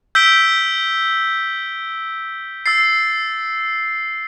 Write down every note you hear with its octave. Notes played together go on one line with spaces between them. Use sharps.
E6 G6 B6 D7 G7
E6 A6 C7